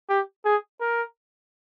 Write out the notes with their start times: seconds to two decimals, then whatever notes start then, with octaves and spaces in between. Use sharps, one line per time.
0.09 G4
0.45 G#4
0.81 A#4